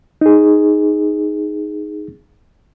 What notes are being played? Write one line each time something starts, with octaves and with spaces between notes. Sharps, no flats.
D#4 G#4